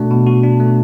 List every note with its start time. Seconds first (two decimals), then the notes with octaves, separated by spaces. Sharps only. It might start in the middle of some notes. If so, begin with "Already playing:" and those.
Already playing: B2 A3 D4 F#4
0.10 B2
0.27 F#4
0.44 D4
0.60 A3